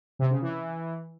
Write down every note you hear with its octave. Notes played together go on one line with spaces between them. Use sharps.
C3
C#3
E3